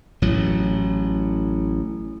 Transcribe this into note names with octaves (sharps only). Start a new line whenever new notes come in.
A1 A2 F#3